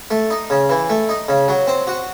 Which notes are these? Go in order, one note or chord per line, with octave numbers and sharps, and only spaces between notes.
A3
D#4
C#3
E3
A3
D#4
C#3
F#3
C4
F#4